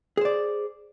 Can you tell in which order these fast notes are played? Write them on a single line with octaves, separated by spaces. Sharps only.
G#4 C5 D5